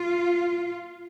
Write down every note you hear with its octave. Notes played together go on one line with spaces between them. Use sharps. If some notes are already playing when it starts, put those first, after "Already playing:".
Already playing: F4